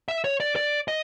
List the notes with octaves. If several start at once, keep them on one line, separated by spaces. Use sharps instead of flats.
E5
C#5
D5
D5
D#5